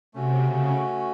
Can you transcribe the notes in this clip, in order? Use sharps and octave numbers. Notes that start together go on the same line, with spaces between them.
C3 A3 C#4 F#4
C#3